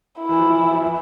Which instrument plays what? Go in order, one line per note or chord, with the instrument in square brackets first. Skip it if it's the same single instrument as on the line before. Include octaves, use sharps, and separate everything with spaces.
[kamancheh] E4
[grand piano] E3
F3
E3
E3
F3
E3